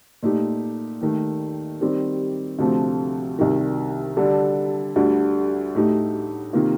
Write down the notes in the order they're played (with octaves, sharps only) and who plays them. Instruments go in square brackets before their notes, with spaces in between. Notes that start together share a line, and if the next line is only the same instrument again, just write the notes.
[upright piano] A#2 A3 D#4 G4
D#2 D#3 A3
D#3 G3 C4 G4
D2 C3 F3 A3 C4
C2 C3 D#3
D3 G3 D4 A4
D2 D3 G3
A2 A3 D#4 G4
C3 D#3 A#3 F4